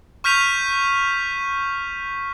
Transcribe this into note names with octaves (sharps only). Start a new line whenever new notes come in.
C#6 F6 G6 B6 D#7 F7